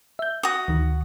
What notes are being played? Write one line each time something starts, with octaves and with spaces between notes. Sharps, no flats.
E5 G6
F#4 D#6
D2 D#3